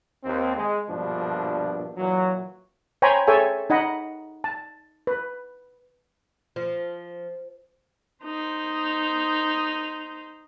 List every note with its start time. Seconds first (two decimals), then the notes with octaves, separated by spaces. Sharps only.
0.24 D#2 C4
0.56 G#3
0.90 A#1 G2 B2 F3 D4
1.97 A#2 E3 F#3
3.02 C5 C#5 G5 G#5 A#5 B5
3.27 G#4 A4 C#5 E5 G5 G#5
3.70 D#4 D#5 F#5 B5
4.44 A5
5.07 B4
6.56 F3
8.25 D#4 C5